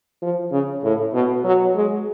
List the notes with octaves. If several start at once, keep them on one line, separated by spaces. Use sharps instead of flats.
F3
C#3
A2
B2
F#3
G#3